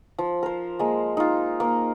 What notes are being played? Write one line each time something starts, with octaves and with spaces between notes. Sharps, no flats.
F3
A#4 C5
G#3 A#3
D#4 F4
A#3